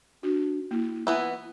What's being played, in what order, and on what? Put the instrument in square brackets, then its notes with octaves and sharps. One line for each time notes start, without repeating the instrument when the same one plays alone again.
[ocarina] D4 [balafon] F#4
[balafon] A#3 [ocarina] E4
[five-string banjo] E3 B3 E4 [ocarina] F4